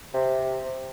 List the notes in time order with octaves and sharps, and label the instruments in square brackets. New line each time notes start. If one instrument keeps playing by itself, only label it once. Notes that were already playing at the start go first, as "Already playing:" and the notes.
[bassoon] C3